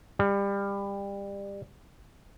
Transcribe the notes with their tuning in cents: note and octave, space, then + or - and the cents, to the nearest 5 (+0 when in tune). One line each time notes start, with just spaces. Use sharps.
G3 +25